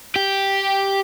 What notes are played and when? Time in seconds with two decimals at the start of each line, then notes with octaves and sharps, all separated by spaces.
0.16 G4